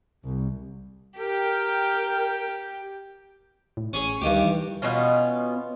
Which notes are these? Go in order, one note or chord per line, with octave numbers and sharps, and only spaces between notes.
C2
G4 A#4 G5
A2
A1 C#4 G#4 C#5
D2 G2 D#3 G4
E3
B2 B3 C#4 F4